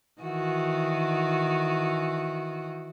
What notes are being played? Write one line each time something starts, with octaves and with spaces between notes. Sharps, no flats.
D#3 E3 F#4